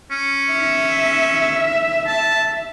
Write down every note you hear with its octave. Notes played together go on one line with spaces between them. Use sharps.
C#4
E5
A5